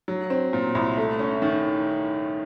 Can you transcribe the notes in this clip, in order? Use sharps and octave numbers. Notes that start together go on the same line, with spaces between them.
F#3
C4
A#2
C2
A3
C#4
D#3